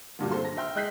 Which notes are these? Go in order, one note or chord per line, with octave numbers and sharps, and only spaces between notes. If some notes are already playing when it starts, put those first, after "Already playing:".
D2 G2 A#2 F#3
D#2 D3 C4 A4 C6
A#6
E5 G5 C6 F6
G#3 D#5 F#6 G6 B6 C7